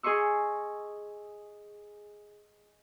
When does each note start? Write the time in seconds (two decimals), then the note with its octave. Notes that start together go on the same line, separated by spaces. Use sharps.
0.03 G#4 D#5 C6 C#6 E6